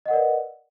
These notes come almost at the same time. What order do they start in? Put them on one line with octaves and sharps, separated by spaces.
D#5 F#5 A#4 D5 B4